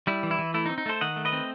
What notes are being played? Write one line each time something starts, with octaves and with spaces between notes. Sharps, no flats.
G3 E4
E3
E4
E3
A3 E4
D#4
C4
D#4
A3 A4 C5
D#3 D#5 F#5
A3
B4 D#5
C4